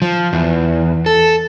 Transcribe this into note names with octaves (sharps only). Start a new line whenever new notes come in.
F3
E2
A4